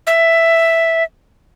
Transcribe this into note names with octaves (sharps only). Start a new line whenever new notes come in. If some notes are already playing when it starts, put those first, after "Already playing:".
E5